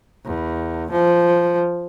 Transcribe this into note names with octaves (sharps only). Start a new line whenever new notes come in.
E2
F3